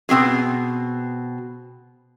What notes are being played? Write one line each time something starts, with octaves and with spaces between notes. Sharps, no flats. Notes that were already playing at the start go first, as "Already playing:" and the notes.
B2 C4 G4 G#4